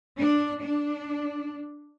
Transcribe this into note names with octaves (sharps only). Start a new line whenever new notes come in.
D4
D4